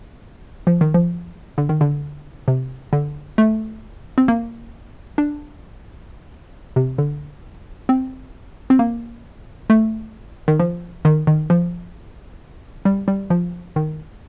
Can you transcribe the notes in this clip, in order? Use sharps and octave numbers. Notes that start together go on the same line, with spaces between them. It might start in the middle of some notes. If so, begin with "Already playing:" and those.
F3
D#3
F3
D3
D#3
D3
C3
D3
A3
C4
A#3
D4
C3
D3
C4
C4
A#3
A3
D#3
F3
D#3
D#3
F3
G3
G3
F3
D#3